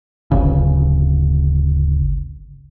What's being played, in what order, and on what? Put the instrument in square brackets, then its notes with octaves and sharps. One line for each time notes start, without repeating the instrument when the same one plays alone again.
[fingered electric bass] D1 G1 C#3